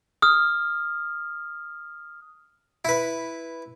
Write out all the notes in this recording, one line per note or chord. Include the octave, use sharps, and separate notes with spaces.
D#6 F6
E4 B4